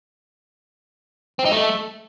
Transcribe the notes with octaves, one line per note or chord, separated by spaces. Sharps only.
C4
D#4
A3